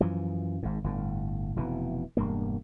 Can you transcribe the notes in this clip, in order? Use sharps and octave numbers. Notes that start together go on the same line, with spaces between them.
F#2 E3 F3
G#1 G#2
G1 A2
F1 B2 E3
E1 G2 A#3